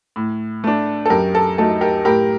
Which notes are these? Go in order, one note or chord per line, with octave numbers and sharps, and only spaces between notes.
A2
A3 D4
A4
F#2 G4 A#4
A4
F#3 A3 D#4 A4
G4 A#4
A2 G4 A#4